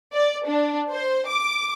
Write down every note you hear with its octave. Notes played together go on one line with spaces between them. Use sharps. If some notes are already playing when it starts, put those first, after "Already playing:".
D5
D4
C5
D6